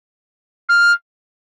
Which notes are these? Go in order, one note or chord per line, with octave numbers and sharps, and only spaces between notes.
F6